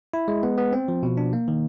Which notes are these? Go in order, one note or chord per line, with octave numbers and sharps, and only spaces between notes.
E4
G#3
B3
B3
C4
F3
B2
D4
A#3
D#3